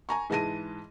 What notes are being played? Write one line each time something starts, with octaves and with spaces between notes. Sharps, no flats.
G#5 A#5 C#6
G#2 E3 G#3 A5 A#6 D#7